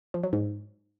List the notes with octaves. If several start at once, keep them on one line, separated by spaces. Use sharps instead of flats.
F3
F#3
G#2